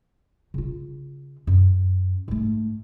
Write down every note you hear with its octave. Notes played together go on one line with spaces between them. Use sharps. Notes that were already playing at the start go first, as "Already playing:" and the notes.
C#3 F4
F#2
G#2 A3